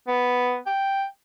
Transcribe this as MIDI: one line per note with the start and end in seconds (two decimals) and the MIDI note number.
0.08 0.57 59
0.67 1.04 79